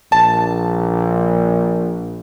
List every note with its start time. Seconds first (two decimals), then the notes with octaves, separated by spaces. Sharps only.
0.12 A#1 A5